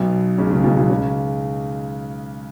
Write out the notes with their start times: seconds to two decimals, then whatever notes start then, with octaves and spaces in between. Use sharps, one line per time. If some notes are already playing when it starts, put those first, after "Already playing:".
Already playing: B1 B2
0.38 C#2 C#3
0.51 C#2 C#3
0.64 B1 B2
0.76 B1 B2
0.89 C#2 C#3